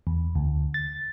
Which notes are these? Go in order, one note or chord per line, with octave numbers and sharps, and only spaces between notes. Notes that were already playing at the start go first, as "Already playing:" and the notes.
E2
D2
A6